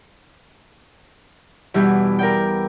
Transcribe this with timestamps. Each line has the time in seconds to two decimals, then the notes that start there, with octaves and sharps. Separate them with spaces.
1.74 E2 B2 G3 E4 G4
2.19 A#4 D5 G5